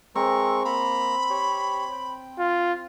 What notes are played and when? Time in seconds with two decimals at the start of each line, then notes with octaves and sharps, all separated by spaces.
0.15 G#3 C4 A#4 C#6
0.65 A#3 A#5 B5
1.30 G4 C#5
1.92 G5
2.39 F4